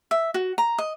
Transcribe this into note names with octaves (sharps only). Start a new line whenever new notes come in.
E5
F#4
A#5
D#5